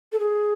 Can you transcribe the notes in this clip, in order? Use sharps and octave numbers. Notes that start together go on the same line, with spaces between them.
A4
G#4